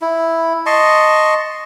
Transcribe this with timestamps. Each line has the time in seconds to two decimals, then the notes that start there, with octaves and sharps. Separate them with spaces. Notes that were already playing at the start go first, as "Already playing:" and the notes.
0.01 E4
0.66 D#5 A5 C6 C#6